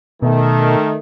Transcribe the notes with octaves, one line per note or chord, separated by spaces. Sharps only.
B2 D#3 A3